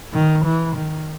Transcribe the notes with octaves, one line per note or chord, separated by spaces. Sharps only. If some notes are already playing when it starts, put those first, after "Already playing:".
D#3
E3
D#3